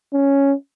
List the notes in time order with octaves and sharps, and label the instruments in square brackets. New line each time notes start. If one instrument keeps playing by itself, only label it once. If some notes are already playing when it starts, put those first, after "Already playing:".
[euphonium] C#4